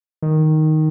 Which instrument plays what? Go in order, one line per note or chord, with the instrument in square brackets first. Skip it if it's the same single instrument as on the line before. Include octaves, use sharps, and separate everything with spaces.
[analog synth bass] D#3